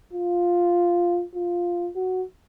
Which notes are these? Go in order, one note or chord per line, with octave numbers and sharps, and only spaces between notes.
F4
F4
F#4